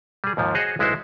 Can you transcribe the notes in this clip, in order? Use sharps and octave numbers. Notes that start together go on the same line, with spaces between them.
G3 G#4
D#2 G#2 F3
F#4 G#4 C5 C#5 D#5
B1 G#3 E4 F#4 C5